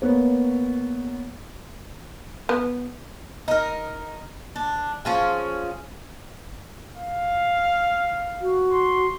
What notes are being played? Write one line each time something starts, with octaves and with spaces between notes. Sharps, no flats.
A#3 B3 C#5
B3
D#4 A#4
D4
F3 C#4 G#4
F5
F#4
C6